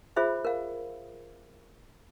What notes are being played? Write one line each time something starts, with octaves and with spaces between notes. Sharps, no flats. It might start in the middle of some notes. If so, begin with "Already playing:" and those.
F4 G#4 C5 E5 B5
A#4 F5